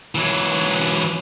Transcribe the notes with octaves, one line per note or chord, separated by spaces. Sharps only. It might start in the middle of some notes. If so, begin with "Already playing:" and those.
E3 F#3